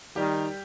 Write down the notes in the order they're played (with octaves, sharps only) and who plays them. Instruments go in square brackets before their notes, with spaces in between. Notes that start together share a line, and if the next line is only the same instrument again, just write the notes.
[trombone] D#3 [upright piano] G3 G4